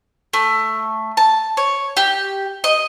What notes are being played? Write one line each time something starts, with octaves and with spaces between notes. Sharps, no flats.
A3
A5
C#5
G4
D#5